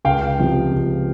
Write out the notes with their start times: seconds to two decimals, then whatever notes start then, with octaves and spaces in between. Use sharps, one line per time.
0.05 C#2 F5 G5
0.39 C3 F3
0.72 C#2